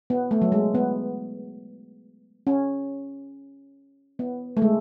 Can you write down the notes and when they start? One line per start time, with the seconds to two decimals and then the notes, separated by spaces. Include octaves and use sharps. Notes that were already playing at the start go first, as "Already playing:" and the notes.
0.10 B3
0.31 A3
0.42 F#3
0.52 G#3
0.75 B3
2.47 C#4
4.19 B3
4.57 A3
4.62 G#3